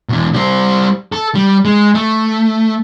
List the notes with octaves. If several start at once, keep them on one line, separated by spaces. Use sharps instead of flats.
B2 E3
G3 C5
A4
G3
G#3
A3